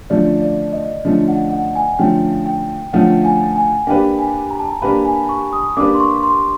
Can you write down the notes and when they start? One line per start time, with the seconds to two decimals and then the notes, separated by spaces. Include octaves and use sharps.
0.10 D3 F3 A3 C#4 D5
0.42 D5
0.73 D#5
1.05 D3 F3 A3 C#4
1.28 F#5
1.51 F#5
1.76 G#5
1.99 D3 F3 A3 C#4 G5
2.46 G5
2.93 D3 F3 A3 C#4 F#5
3.25 G#5
3.56 G#5
3.87 A#3 D4 G4 B4 G5
4.19 G#5
4.51 A#5
4.59 A5
4.68 A#5
4.81 A#3 D4 G4 B4 B5
5.05 G#5
5.29 C#6
5.53 D#6
5.77 A#3 D4 G4 B4 D6
5.95 C6
6.00 C#6
6.23 C6